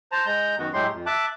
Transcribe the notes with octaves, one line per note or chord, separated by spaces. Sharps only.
C5 A5 A#5
G#3 A#5 G6
F#2 D#3 B3 F#4
A2 F#3 G#3 A3 G4 C6
F2
E5 A5 D6 F#6